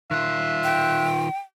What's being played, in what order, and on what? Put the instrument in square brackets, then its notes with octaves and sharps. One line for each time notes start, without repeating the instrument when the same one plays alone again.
[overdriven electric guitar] D#3 F4 [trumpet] E5 [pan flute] F#6
[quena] G5